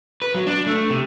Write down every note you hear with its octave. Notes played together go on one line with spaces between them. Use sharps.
B4
F#3
D4
A3
C3